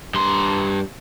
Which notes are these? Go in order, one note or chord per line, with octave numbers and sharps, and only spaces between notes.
G2 C6